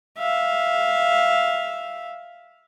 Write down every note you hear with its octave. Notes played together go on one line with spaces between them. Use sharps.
E5 F5